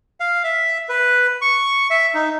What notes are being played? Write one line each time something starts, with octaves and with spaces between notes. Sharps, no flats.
F5
E5
B4
C#6
E5
D#4